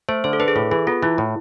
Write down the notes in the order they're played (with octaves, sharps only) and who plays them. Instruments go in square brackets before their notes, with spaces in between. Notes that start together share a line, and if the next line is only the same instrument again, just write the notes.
[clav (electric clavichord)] A3 [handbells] C5
[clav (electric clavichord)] D3 [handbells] C5
[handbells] A4
[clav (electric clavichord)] D4 [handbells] B4
[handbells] G#4
[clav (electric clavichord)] A2 [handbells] A4
[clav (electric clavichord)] E3 [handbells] G#4
[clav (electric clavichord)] B3 [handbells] F4
[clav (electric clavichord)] E3 [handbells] E4
[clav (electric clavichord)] A2